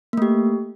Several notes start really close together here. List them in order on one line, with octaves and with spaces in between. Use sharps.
A#3 A3 G4